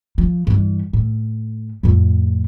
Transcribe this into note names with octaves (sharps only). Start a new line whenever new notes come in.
F3
G2 E3
A2
F2 A2